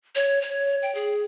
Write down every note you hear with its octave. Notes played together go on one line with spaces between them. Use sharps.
C#5
C#5
G5
G#4